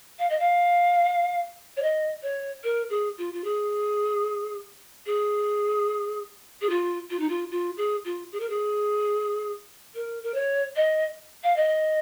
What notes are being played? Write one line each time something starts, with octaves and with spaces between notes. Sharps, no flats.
F5
D#5
F5
C#5
D#5
C#5
A#4
G#4
F4
F4
G#4
G#4
G#4
F4
F4
D#4
F4
F4
G#4
F4
G#4
A#4
G#4
A#4
A#4
C#5
D#5
F5
D#5